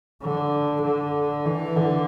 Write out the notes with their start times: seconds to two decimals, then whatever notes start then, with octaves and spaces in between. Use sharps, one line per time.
0.22 D3
0.83 D3
1.46 E3
1.76 D3